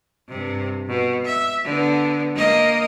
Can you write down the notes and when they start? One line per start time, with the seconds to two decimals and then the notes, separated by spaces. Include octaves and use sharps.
0.28 G2 C3
0.88 B2
1.25 E5
1.64 D3 B3
2.35 A#3 D#5